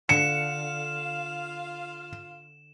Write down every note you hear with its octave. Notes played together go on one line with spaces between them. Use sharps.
D3 F4 F5 C#7 E7